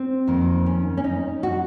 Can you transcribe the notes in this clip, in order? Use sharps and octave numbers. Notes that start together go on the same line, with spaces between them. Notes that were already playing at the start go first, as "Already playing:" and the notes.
Already playing: C4
F2 D#3 A#3
C#4
C#4
D#4
F#4